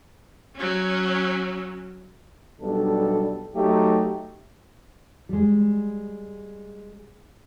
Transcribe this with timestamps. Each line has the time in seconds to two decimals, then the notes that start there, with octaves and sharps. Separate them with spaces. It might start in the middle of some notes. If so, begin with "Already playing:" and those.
0.55 F#3 C#4
2.61 B1 G3 D4 A4
3.55 F#3 A3 D#4 G4
5.29 G3 G#3